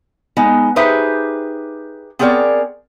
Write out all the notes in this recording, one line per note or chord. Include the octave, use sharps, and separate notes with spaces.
G#3 B3 D#4
D#4 G4 G#4 B4 C5 E5
B3 C4 G#4 A#4 C#5 D5